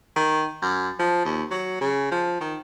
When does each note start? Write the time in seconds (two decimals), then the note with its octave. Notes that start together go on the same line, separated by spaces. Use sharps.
0.16 D#3
0.62 F#2
0.99 F3
1.25 D#2
1.51 F#3
1.81 C#3
2.11 F3
2.40 D#3